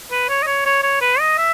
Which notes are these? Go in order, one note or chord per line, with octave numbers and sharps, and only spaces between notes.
B4
C#5
D#5
C#5
C#5
C#5
B4
D#5
E5